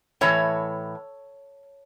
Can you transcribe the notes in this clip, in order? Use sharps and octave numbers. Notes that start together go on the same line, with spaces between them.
A2 E3 C#5